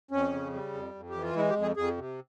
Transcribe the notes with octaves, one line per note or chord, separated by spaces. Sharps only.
F2 C#4
C#3
G3
F2
F2
E3 G4
F4
G#3 E4
G4
F2
G#4
F2 G#4
C3